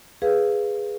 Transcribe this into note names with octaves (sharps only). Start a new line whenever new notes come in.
G#4 B4 F5